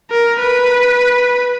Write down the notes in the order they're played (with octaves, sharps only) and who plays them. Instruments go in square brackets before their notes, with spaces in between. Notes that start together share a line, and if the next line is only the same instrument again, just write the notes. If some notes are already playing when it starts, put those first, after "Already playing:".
[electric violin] A#4
B4